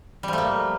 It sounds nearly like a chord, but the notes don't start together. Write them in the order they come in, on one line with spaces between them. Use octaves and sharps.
G3 F3 A3 A#3